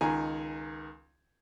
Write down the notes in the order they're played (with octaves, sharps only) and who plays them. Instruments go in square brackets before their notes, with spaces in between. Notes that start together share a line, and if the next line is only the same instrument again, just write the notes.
[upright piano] C#2 D#3 G#5 A#5